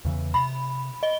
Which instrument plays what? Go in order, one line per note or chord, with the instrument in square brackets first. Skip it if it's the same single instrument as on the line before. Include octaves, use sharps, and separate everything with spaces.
[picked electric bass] E2 C#3 E3
[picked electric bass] C3 [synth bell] B5
[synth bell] D#5 G7